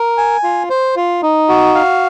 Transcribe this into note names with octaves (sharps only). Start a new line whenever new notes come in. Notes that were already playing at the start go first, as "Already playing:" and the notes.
Already playing: A#4
G#5
F4
C5
F4
D#4
F#4
F5